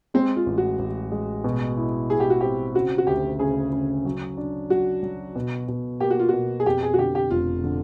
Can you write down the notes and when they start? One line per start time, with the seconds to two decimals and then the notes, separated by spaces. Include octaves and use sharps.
0.14 G#3 C4
0.36 F4
0.46 A1
0.58 F#4
0.79 A1
1.12 G#3
1.44 B2
1.77 E4
2.10 E4 G#4
2.20 G4
2.30 F#4
2.41 C4 G4
2.75 C#3 F#4
2.98 F#4
3.07 D2 G4
3.39 C#3 G#4
3.72 C#3
4.05 F#3
4.37 D4
4.70 F#3 F#4
5.03 F#3
5.36 B2
5.68 B2
6.00 A#3 G4
6.10 F#4
6.20 F4
6.29 B2 F#4
6.60 G#4
6.65 F2 G4
6.83 G#4
6.94 F#4
6.98 D3 G4
7.15 G4
7.30 F1 F4
7.64 D3